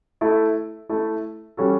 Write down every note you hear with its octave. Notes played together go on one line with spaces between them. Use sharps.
A3 E4 A4
A3 E4 A4
G3 C#4 F#4 A4